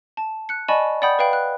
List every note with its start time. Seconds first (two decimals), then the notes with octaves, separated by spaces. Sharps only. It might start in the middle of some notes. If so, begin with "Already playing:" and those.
0.17 A5
0.49 F#6 C#7
0.68 D5 D#5 G#5 A5 B5 C#6
1.02 D5 F#5 G5 B5 D#6 G6
1.19 B4 F5 G5 B5
1.33 F#6